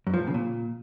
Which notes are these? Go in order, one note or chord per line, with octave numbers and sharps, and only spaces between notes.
F#2
F3
A2
C#3
A#2